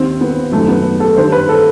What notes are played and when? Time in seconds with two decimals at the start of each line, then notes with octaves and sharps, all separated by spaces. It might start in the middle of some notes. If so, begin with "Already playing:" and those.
Already playing: D#2 D#3 C4
0.21 B3
0.52 F#2 D#3 A3
0.68 B3
1.00 A4
1.16 G2 D#3 C5
1.32 B4
1.49 A4